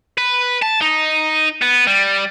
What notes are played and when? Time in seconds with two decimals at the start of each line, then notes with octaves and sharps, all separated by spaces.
0.18 B4
0.62 A5
0.81 D#4
1.62 B3
1.87 G3